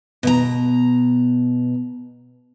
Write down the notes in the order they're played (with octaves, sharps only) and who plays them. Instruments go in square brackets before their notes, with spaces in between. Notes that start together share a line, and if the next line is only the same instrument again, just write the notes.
[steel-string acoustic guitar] B2 E5 A#5